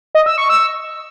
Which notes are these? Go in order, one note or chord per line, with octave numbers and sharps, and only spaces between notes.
D#5
E6
C#6
E6